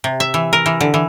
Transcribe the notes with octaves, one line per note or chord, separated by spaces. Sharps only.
C3
E5
E3
A#4
E3
D3
E3